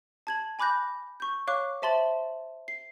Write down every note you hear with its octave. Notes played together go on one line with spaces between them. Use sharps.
A5 G#6 F#7
G#5 B5 D6 F#6 G6 A#6
C#6 G6
C#5 F5 C#6 D6 F#6
C5 E5 A5 C6 A6 F#7
C7